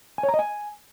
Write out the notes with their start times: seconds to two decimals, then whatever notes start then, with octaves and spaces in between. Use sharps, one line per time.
0.18 G#5
0.23 C#5
0.29 A#5
0.34 D#5
0.39 G#5